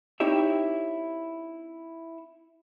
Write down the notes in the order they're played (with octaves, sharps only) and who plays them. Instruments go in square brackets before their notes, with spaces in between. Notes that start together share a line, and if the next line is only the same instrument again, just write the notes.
[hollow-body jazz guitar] C4 D#4 E4 G4 C#5 E5